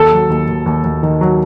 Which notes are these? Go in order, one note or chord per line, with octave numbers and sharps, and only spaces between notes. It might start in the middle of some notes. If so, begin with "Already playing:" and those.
Already playing: D#2 A4
F#3
D#2
D#2
D#2
D#2
D#3
F#3